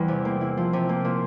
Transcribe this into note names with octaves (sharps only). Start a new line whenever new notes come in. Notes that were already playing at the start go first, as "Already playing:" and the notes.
Already playing: E2 E3 G3 C4
C3
A#3
E4
F3
C3
A#3
A#2